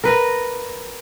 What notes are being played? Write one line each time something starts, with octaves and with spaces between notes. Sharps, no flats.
A#4 B4